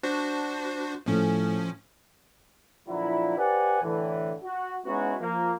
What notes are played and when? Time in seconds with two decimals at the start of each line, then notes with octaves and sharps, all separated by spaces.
0.03 D4 F#4 C5
1.06 A2 F3 C#4
2.88 A#2 D3 F3 F#3 E4
3.37 G4 B4 C5 D5 F#5 G#5
3.82 A2 D3 E3
4.43 F#4
4.85 G#3 B3 C#4 D#4 E4 F#4
5.20 F3 A#3